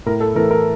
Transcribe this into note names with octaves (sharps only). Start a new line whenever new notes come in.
A2 A#4
A4
E3 A3 A#4
A#4